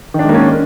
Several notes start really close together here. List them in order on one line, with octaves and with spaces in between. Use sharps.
D#3 D4 G#3 A#3 C#4